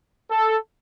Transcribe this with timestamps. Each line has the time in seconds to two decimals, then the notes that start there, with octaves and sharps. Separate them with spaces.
0.29 A4